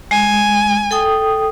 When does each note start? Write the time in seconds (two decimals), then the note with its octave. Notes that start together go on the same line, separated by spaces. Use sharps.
0.11 G#3 G#5
0.91 A4 G5 D#6